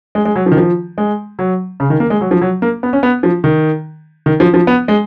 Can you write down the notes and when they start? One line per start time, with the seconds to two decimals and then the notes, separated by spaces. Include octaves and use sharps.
0.15 G#3
0.25 G#3
0.35 F#3
0.46 F3
0.51 D#3
0.57 F3
0.98 G#3
1.39 F#3
1.80 C#3
1.90 D#3
2.00 A#3
2.10 G#3
2.21 F#3
2.31 F3
2.41 F#3
2.62 A#3
2.83 B3
2.93 C#4
3.03 B3
3.23 F3
3.44 D#3
4.26 D#3
4.40 F3
4.54 F3
4.67 B3
4.88 G#3